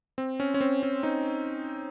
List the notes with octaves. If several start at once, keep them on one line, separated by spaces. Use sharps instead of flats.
C4
C#4
C#4
C4
C#4
C4 D#4